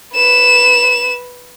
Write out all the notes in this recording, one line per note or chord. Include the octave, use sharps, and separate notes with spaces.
B4 E7